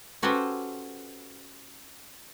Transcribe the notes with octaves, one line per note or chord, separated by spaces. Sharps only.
C#4 F#4 G4 A4 B4 C5